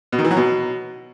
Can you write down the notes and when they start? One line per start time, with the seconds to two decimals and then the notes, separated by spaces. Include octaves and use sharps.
0.12 B2
0.19 D#3
0.25 E3
0.31 F#3
0.37 B2